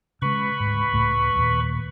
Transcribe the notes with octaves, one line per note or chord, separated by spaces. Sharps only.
C#3 G#3 B4 B5 C#6
D2 G#2
C#2 A2 A3
D#2 A#2